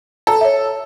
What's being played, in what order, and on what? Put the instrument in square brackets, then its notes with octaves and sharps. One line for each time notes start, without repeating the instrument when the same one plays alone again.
[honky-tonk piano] A4 [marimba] A#5
[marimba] C#5 E5